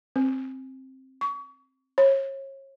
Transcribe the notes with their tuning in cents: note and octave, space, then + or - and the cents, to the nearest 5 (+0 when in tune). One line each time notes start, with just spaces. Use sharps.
C4 +10
C#6 +35
C#5 -35